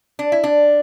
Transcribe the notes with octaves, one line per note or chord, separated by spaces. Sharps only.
D4
E4
D4